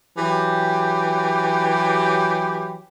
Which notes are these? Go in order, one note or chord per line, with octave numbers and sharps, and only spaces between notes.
E3 F#3 G4